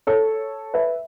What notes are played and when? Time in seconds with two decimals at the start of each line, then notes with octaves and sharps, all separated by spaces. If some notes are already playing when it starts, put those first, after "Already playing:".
0.07 A4 C#5
0.74 B4 E5